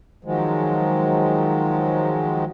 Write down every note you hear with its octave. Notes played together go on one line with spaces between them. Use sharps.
D#3 F3 F#3 G#3